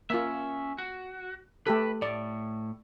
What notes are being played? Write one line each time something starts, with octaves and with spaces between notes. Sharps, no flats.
A#3 C#4 F4 E5
F#4
A3 G4 A4 B4
A2 D5